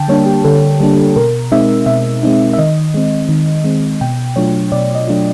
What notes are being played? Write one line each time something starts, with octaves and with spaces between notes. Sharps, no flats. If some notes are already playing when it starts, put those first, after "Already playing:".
Already playing: D3 G5 A5
G3 A#3 D4 C#5
G4
D3 A4
G3 A#3 D4
B2 A#4
G#3 C4 D#4 E5
B2 E5
G#3 C4 D#4
E5
D#3 D#5
G#3 C4
D#3
G#3 C4
B2 G5
F#3 A3 D4 F4 C#5
B2 D5
D#5
F#3 A3 D4 F4